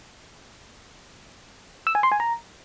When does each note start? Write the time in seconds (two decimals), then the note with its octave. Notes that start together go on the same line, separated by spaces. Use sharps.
1.87 E6
1.95 G#5
2.03 C6
2.12 G#5
2.20 A#5